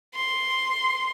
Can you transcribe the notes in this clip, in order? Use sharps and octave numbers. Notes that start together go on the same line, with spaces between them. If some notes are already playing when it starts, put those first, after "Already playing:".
C6